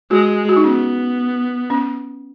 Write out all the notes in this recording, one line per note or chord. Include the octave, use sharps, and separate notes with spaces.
G#3 F#4
F#4
D#4
B3 C#4
C#4